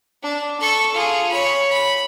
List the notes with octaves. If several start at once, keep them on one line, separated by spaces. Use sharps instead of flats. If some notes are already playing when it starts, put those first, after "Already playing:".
D4
A4 C#6
F4 G#4
C#5 B5
B5